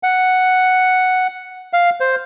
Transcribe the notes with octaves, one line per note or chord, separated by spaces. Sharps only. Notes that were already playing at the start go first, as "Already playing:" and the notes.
F#5
F5
C5